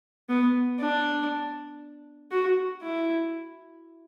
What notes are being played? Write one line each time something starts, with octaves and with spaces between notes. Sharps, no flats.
B3
D4
F#4
E4